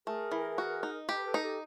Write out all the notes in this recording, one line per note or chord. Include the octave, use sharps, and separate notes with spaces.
A3 G#4 A#4
E3
F#4
D#4
G4 A4 B4
A4 B4
D#4
G4 A4